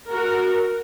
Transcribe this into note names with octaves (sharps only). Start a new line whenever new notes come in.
F#4 A#4